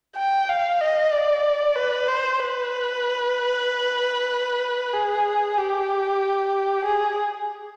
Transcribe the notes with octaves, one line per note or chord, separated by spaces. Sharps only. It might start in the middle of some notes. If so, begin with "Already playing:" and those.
G5
F5
D#5
D5
B4
C5
B4
G#4
G4
G#4